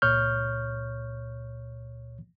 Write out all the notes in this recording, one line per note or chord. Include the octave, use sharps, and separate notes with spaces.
C#2 A#2 C#5 C#6 F6 G6